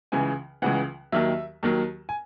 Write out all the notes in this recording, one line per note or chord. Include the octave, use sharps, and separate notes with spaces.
C#2 C#3 E3 G#5
C#2 C#3 E3 F#5
D#2 D#3 F#3 E5
D#2 D#3 F#3
G#5